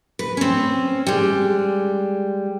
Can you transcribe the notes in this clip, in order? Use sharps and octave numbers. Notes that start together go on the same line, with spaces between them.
B4
C4 C#4
G3 G#3